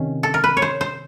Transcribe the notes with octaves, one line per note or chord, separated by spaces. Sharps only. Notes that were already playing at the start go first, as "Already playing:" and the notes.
Already playing: C3 D#3 C#4
A4
A#4
B4
C#5
C5
C5